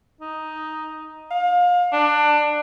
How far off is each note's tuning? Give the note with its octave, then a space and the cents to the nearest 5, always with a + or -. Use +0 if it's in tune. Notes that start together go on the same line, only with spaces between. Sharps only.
D#4 +5
F5 +30
D4 +20